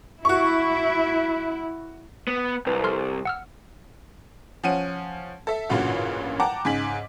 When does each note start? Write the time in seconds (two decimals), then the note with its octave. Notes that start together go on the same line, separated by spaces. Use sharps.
0.25 E4 F#4 C#6
2.28 B3
2.66 C2 C4 B4
2.84 A4 C6 F6
3.25 F#5 E6 F6
4.64 F3 C#4 F#5 D#7
5.47 A4 E5
5.69 A1 G2 A#2 C#3 F4 F#4
6.40 F#5 G5 A5 A#5 D6
6.65 G#2 C#3 G#5 B6 F#7